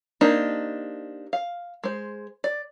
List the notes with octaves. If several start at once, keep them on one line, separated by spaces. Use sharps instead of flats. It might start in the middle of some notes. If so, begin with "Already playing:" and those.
A#3 C4 D4 D#4 G4
F5
G#3 C5
D5